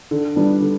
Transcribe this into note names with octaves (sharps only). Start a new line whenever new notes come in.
D3
G3 B3 D4
D3